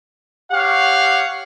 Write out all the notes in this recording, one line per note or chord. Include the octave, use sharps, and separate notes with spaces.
G4 C#5 F5 F#5